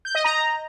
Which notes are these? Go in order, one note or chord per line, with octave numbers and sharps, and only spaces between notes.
G6
D#5
A#5